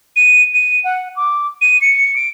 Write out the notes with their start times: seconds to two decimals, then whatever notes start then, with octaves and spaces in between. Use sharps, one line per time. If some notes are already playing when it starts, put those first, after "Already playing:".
0.16 D#7
0.54 D#7
0.84 F#5
1.16 D6
1.61 D#7
1.81 C#7
2.16 D7